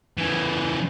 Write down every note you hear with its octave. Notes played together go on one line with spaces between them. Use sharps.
C#3 E3